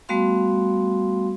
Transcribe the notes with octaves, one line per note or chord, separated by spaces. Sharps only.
G3 A3 B3 F#4 F5 C6